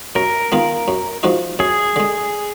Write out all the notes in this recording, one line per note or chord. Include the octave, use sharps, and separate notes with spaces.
F#2 A#4
D#3 G#3 B3 F4
F#2
F3 G#3 D#4 F#4
F#2 G#4
D3 G#3